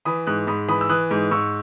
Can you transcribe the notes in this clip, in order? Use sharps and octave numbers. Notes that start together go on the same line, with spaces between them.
E3 B5 D#6
G#2 D#6 F#6
G#2 B5 D#6
E3 B5 D#6
E6
E3 D#6 F#6
G#2
G#2 C#6 E6